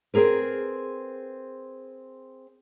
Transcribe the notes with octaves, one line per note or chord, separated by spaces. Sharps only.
C4 G#4 A#4 B4